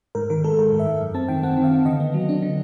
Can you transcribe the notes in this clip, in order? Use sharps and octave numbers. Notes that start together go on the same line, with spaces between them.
G#2 A#4
D#3 A#4
G#3 A4
G#2 A#4
G#2
E5
G#2
F#2
C4 A5
D#3 G5
C4 F#5
D#3
F5
C4
D3 D#5
B3
F#3
D4
D3